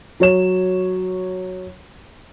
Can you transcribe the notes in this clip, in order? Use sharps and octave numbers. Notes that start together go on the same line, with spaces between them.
F#3 C#5 E7